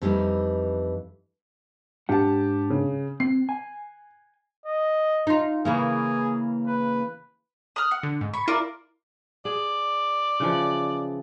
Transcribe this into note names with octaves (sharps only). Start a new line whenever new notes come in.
F2 E3 G3 A3 D#4
G#2 D4 G4 F#5 A5
C#3
C4 C7
G#5
D#5
D#4 F4
C#3 E3 A#3 G#4
B4
D#6 F6 F#6
F#5
D3
G#2
B5 C#6
E4 F4 A#4 D5
G#4 D5
C#3 E3 F3